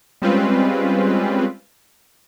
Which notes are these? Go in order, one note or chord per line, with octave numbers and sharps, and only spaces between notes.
G3 G#3 C4 C#4 F4 B4